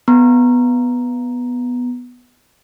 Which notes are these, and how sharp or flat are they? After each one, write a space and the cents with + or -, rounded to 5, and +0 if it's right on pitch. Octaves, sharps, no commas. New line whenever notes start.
B3 +0 A#5 +0